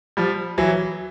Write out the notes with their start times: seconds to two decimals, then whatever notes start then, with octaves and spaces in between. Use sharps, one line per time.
0.17 F3 G3
0.58 E3 F#3